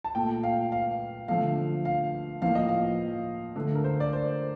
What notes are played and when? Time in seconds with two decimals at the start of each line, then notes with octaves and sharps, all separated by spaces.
0.04 A5
0.15 A#2 A3 G5
0.43 F5
0.72 F5
1.28 D3 F3 A3 F5
1.85 F5
2.41 A2 F3 A#3 F5
2.55 D#5
2.69 F5
3.56 D3 A3
3.75 A#4
3.84 C5
4.00 D5
4.13 C5